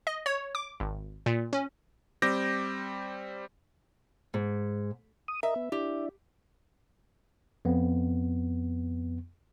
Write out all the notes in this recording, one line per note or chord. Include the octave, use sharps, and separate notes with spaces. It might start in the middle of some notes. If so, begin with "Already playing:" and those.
D#5
C#5
D6
G#1
A#2
C#4
G3 C4 D6 G6 A#6
G#2
D#6
A#4 D#5 E5
B3
D4 E4 G4
F2 B3